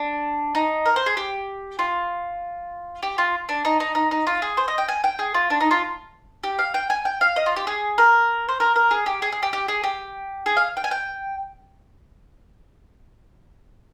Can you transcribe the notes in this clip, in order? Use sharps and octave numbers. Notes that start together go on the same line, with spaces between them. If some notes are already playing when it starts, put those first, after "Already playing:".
Already playing: D4
D#4
A#4
C5
G#4
G4
F4
G4
F4
D4
D#4
D#4
D#4
D#4
F4
G#4
C5
D#5
G5
G#5
G5
G#4
F4
D4
D#4
F4
G4
F5
G5
G#5
G5
F5
D#5
F4
G4
G#4
A#4
C5
A#4
A#4
G#4
G4
G#4
G#4
G4
G4
G#4
G4
G#4
F5
G5
G#5
G5